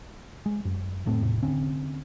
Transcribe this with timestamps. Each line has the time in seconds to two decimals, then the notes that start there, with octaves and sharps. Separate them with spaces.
0.46 G#3
0.65 F#2
1.06 F1 A2 A3 C4
1.22 E2 A2 C3
1.43 D3 C4 C#4